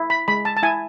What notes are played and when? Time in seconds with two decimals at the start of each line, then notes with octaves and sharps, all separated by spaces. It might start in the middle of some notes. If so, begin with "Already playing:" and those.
Already playing: E4
0.10 B5
0.28 G#3 B5
0.45 A5
0.57 A5
0.63 E4 G#5